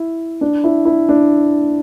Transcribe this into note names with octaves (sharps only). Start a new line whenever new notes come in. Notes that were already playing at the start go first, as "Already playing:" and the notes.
Already playing: E4
D4
E4
E4
D4